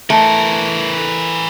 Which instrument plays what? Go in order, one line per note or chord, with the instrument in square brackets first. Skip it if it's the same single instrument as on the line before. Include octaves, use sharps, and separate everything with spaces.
[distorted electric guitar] E3 A#4 [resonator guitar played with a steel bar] A3